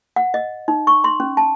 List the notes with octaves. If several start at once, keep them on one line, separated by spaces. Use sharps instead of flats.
F#5
D#5
D#4
C#6
C6
C#4
A5